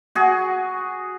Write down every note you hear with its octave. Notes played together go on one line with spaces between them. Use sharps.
F#4 G#4